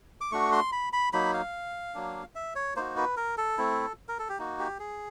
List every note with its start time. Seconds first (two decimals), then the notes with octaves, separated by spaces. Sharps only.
0.21 D6
0.32 A3 D4 F#4 C#6
0.52 C6
0.72 B5
0.93 B5
1.13 F#3 A#3 D#4 B5
1.34 F5
1.95 F#3 A#3 D4
2.35 E5
2.55 C#5
2.76 A#3 D#4 F#4 C5
2.97 B4
3.17 A#4
3.38 A4
3.58 A3 C4 E4
4.09 A#4
4.19 A4
4.29 G4
4.39 A#3 D#4 F#4
4.59 G4
4.80 G#4